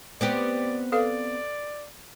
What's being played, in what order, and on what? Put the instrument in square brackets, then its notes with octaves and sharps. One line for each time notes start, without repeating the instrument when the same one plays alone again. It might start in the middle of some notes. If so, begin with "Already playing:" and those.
[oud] B3 C4 G4 [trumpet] D5
[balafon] A4 B4 F5 [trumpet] D5